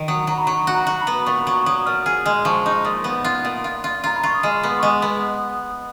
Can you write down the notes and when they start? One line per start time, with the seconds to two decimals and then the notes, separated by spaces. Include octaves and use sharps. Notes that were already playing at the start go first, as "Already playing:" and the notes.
Already playing: D#3
0.08 F#3 D#6
0.27 F#3 A#5
0.37 B5
0.47 F#3 C#6
0.67 F#4
0.74 A#5
0.87 F#4
0.96 A#5
1.01 B5
1.07 B3
1.22 B5
1.26 A#2 C#6
1.46 F#3 C#6
1.61 C#6
1.66 F#3 D#6
1.86 A#2 F6
2.06 G#4 F6
2.25 G#3 F6
2.45 F3 C#6
2.65 D#4 C#6
2.85 A#2 D#6
3.04 B3
3.24 F4
3.45 A#2
3.64 F4
3.84 F4
4.04 F4 A#5
4.15 B5
4.23 F4 C#6
4.34 D#6
4.43 G#3 F6
4.63 B3
4.79 C#6
4.83 G#3 D#6
5.02 B3